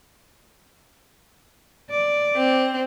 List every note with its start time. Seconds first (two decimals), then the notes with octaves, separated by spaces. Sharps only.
1.90 D5
2.36 C4